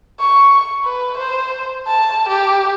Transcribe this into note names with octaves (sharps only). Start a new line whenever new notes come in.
C#6
B4
C5
A5
G4